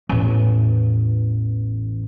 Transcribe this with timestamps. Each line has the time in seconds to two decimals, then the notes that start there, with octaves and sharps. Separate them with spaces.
0.09 A1 E2